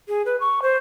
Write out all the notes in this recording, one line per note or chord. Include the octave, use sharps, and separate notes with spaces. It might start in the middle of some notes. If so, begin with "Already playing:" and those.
G#4
B4
C#6
C5